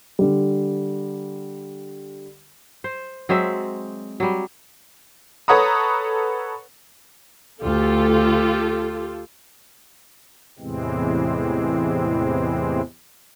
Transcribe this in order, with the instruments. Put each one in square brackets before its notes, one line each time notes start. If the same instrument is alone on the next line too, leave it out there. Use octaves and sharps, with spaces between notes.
[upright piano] D3 G3
[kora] C5
F#3 G#3 C4 E5
F#3 G3
[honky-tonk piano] A4 B4 C#5 F#5 A#5 D#6
[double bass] D2 A3 [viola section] F4 G4 A4
[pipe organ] E2 A2 C3 E3 G#3 C4